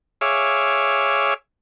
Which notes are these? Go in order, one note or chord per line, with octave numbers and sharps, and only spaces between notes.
G#4 C#5 E5 F5 D6